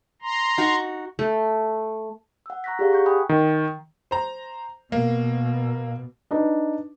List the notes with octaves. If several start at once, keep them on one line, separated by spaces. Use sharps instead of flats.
A#5 C6
D#4 F#4
A3
F#5 E6
A#5 C#6 F#6 A#6 B6
G4 G#4 D5 F5 F#5
F#5 C#6 G6
G5 G#5 B5 D#6 F#6 G6
D#3
C5 A#5
B2 A#3
D4 D#4 B4